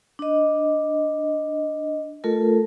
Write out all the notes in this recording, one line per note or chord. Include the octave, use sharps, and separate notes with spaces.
D4 D#5
A3 F4 A4 A#4